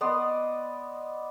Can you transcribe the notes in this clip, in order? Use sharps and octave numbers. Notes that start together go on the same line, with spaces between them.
B3 D5 D#5 C6